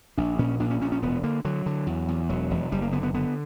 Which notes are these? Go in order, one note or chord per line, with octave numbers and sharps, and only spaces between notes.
A#1 D4
A#2 C#4
A#1 D4
C#4
A#2 C#4
C#4
E1 B3
D3 A#3
D3 F#3
D3
E2
E2
E1 F#3
E1
F#1 G3
A#3
D3 B3
B3
D3 B3